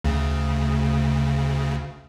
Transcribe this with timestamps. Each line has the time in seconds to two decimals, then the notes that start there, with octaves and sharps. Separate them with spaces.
0.04 D2 C#3